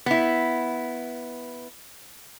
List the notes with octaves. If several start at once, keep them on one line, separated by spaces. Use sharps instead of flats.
B3 E4